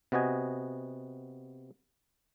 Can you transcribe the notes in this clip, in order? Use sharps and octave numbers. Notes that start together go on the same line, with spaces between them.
C3 B3 F#4 D#5 G#5